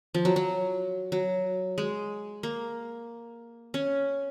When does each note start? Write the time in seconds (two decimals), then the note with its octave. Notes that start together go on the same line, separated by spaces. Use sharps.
0.14 F3
0.25 F#3
0.36 F#3
1.12 F#3
1.78 G#3
2.43 A#3
3.74 C#4